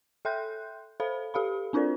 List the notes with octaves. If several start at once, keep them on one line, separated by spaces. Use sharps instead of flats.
A4 E5 G5 C6 F#6 G6
A4 C5 F5 B5
G4 A4 F5 B5
C4 D4 F4 A#4 C5 D5